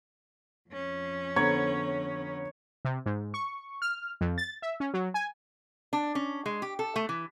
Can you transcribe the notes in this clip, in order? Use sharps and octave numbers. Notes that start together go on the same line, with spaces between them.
F2 C#4
D3 B3 C#5 A#5
C3
G#2
C#6
F6
F2
A6
E5
C#4
F#3
G#5
D4
C#4
G#3
G4
A4
A3
E3